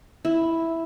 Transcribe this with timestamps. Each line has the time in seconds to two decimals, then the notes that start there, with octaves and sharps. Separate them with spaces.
0.25 E4